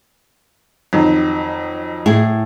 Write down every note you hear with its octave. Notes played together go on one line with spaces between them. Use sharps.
F2 D#3 F#3
A2 E4 G#4